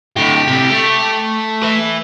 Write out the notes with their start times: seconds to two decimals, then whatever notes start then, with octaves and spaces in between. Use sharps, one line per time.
0.16 A2 D3 G4
0.47 C3 G3
0.70 A3
1.63 B4 E5